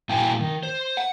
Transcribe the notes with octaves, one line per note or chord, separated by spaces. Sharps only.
A#2 G3 E4 G5 G#5
D#3
C5
F#5